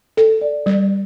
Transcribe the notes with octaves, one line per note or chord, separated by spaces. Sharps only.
A4
D5
G3